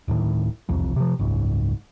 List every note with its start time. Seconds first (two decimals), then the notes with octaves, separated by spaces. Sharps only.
0.08 D1 A2 D#3
0.69 E1 C2 F2
0.96 C3 F3
1.19 F#1 C#2 G#2